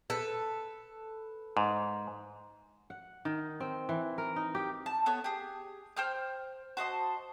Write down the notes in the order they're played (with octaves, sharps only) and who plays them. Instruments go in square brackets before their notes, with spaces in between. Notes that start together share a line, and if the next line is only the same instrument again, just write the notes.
[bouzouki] A4 B4
[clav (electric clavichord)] G#2
[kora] F#5
D#3
C4
E3
A#4
D#4
G4
[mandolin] A5
B3 A4 C#5
G4 G#4
C5 G5 F6 G6
F#4 C5 D#5 A5